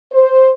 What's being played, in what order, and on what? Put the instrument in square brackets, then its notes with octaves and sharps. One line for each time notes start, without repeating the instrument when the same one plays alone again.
[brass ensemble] C5